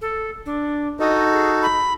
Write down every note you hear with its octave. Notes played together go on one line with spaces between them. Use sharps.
A4
D4
D#4 F#4 A4 D#5
G#4
B5